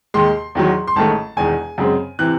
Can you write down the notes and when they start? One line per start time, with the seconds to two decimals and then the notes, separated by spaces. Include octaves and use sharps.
0.14 D#2 D#3 G#3 C6
0.55 E2 D#3 F#3
0.87 C6
0.96 A1 G#2 D#3 A3 A5
1.37 E1 E2 D#3 G#5
1.78 F#2 C#3 G#3 C4
2.19 C3 E3 F#6